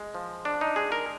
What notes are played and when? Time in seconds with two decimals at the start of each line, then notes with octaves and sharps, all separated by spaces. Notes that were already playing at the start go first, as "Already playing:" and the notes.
Already playing: G#3
0.15 F3
0.45 D4
0.61 D#4
0.76 G#3 G#4
0.92 A#4